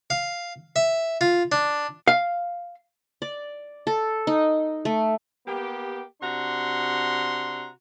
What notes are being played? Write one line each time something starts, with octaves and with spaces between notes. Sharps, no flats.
F5
E5
F4
D4
F5
D5
A4
D#4
A3
A#3 B3 G4
C3 D4 F#4 A#5 C6